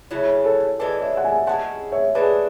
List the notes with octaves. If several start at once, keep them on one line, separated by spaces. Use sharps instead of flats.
C#3 F#3 A3 E4
A4 C#5
E3 G#3 D4 A4 B4 D5
C#5 E5
F#5
E5 G#5
G#3 C#4 E4 F#5 A5
C#5 E5
G#3 D4 F#4 A4 B4 D5